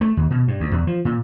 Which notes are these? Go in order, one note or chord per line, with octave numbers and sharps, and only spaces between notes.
A3
D#2
B2
G2
D2
E2
F3
A#2